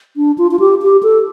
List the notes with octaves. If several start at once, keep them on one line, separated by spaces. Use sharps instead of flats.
D4
F4
F4
G4
G4
A4